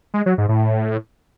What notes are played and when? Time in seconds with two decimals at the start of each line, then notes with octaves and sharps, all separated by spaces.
0.14 G#3
0.26 F#3
0.38 G#2
0.49 A2